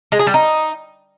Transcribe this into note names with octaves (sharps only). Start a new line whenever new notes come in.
G#3
G#4
G3
D#4